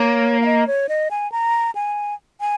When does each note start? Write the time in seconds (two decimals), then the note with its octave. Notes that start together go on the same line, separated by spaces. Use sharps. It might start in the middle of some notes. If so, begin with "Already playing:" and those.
Already playing: A#3 C#5
0.42 F5
0.46 D#5
0.67 C#5
0.89 D#5
1.11 G#5
1.32 A#5
1.75 G#5
2.41 G#5